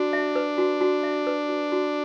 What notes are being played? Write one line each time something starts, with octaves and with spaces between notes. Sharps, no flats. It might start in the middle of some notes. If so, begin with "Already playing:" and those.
Already playing: D4 F#4
E5
B4
F#4
F#4
E5
B4
F#4
F#4